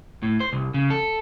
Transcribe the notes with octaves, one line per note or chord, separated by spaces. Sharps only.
A2
C5
C2
C#3
A4